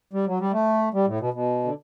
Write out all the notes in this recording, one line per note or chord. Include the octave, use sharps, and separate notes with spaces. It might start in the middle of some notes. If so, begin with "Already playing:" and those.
G3
F#3
G3
A3
G3
A2
B2
B2
D3